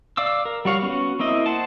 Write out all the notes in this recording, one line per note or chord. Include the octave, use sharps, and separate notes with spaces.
D5 F5 D6 E6
A#4
G3 F#4 C#5 F5
B3 C#4 F#4
A#3 C4 E4 D#5
C5 F#5 A5